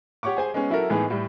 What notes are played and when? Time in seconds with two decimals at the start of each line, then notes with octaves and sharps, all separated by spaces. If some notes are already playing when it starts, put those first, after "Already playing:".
0.23 G4 C#5 F#5 C#6 D6
0.37 G#4 C5 G#5
0.54 G#3 B3 C#4
0.70 F#3 E4 F#4 A4 A#4
0.90 A2 E3 G#3 B3 D#4 G#4
1.10 A2 G3